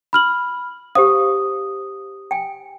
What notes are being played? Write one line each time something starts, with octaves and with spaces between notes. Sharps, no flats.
B5 F6 F#7
G4 C5 F5 D#6
G5 G#5